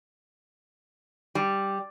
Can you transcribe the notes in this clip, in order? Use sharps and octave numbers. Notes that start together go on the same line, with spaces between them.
G3